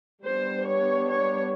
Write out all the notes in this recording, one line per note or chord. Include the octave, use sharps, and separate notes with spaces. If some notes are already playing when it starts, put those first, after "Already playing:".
G3 B3 D4 C5
C#5
C#5